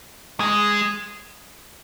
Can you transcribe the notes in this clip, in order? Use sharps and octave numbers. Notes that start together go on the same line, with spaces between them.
G#3